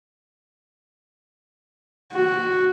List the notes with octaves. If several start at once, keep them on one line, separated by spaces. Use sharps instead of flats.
F#4